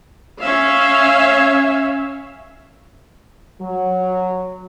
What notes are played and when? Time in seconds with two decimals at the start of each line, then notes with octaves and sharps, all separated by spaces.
0.41 C#4 E5 F5
3.61 F#3